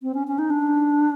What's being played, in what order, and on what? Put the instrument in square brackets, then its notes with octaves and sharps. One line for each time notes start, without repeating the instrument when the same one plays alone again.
[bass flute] C4
C#4
C#4
D#4
D4